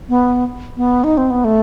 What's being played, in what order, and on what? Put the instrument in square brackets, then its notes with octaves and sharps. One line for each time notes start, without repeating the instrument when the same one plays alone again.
[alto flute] B3
B3
D#4
C4
B3
A3